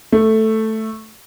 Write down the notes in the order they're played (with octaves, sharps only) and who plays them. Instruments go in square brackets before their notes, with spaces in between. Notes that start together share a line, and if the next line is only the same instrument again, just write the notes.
[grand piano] A3